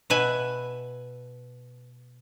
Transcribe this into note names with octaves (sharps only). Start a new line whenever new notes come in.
B2 B4 E5 G#5